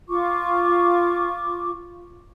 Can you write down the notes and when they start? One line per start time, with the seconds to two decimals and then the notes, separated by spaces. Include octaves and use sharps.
0.09 F4 C#6 D6